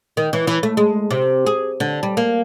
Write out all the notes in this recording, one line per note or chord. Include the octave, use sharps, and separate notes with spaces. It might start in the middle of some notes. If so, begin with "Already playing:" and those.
D#3
E3
E3
A3
G#3
C3
G#4
D3
G3
A#3